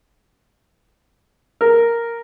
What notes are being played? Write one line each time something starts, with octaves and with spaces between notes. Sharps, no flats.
A#4